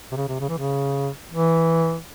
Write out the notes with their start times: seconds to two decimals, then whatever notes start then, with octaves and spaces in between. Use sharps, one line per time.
0.12 C3
0.16 C#3
0.28 C3
0.40 C#3
0.49 E3
0.58 C#3
1.32 E3